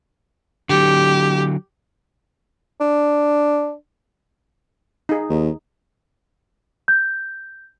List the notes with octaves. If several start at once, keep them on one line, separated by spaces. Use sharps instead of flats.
D3 F#3 G4
D4
D#4 G#4
D#2
G6